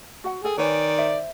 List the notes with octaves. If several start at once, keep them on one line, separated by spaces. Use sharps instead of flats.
F#4 F#5
G#4 A4 G5
D#3 B4 C#5 D5 G#5
C5 E5